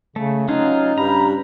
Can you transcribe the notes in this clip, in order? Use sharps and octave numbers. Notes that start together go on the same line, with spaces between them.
C#3 A3
F#3 C#4 D#4 F4 G#4
G2 A#5 B5